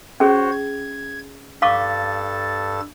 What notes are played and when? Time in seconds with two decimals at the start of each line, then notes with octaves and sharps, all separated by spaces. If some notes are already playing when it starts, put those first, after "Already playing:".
0.20 C#4 F#4 G#4 C5 C#5
0.52 G#6
1.62 G2 A4 F5 C#6 D6 A6